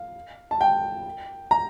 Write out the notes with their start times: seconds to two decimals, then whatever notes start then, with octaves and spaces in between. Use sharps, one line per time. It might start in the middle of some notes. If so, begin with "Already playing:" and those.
Already playing: F5
0.51 A5
0.61 G5
1.51 A#5